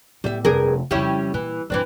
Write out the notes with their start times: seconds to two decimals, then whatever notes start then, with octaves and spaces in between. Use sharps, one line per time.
0.24 A2 G3 B3 E5
0.45 F1 G2 D4 G#4 A#4
0.91 F2 C#3 G3 C#4 E4
1.34 A#2 E3
1.70 G2 A#2 E3 C4 D4